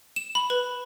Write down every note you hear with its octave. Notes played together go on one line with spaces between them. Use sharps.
E7
B5
B4